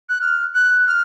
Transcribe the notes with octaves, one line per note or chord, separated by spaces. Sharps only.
F#6
F6
F#6
F6